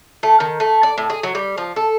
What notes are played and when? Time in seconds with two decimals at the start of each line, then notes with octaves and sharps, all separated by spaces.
0.23 A3
0.40 D#3
0.60 A3
0.83 D5
0.98 A2
1.10 G#4
1.23 F#3
1.35 G3
1.58 F3
1.76 A4